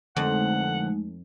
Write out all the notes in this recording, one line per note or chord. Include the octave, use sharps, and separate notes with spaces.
F2 D3 F3 G#3 A3 D#4 F#5